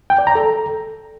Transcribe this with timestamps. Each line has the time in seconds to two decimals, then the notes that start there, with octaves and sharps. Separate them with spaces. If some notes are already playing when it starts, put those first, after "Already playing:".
0.10 G5
0.18 D5
0.27 A#5
0.35 A4